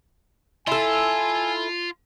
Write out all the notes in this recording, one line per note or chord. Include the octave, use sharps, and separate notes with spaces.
E4 F4 A4 G#5 C6